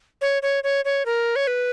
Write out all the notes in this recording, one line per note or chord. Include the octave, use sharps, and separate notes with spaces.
C#5
C#5
C#5
C#5
A#4
C#5
B4